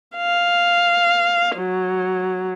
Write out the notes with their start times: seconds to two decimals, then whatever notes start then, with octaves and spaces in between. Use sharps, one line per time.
0.17 F5
1.57 F#3